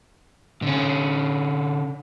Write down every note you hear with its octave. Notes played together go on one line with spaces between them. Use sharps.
D3 C#4